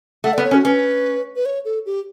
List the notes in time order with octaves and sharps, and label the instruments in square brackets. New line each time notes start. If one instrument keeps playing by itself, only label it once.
[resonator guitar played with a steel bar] A3 [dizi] F#5
[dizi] D5
[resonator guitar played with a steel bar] B3
[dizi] C#5
[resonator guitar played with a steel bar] C#4
[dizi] F#4
[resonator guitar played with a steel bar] C#4 [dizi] B4
[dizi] B4
C#5
A4
G4